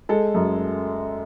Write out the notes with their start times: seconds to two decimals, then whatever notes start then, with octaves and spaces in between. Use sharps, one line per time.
0.09 G#3 A4
0.35 F#2